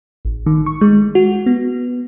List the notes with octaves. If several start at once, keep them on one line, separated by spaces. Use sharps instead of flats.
A1
D#3
C#6
G#3
F#4
B3